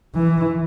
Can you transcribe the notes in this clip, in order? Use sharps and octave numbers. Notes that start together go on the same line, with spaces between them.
E3